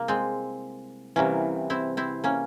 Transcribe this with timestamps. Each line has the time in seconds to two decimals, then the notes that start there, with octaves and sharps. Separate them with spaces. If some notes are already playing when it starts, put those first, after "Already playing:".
Already playing: C2 A#3
0.08 G#3 C4
1.16 C2 C3 E3 A#3 C#4
1.70 C4 E4
1.97 C4 E4
2.24 A#3 C#4